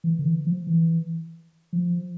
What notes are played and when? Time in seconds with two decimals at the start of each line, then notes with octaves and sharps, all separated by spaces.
0.04 E3
0.19 D3
0.25 E3
0.46 F3
0.67 E3
1.73 F3